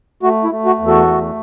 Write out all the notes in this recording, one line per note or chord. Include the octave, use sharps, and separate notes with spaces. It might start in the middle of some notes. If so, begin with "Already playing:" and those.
A3 F#4
E4
A3
F#4
E2
F#4 A4
A3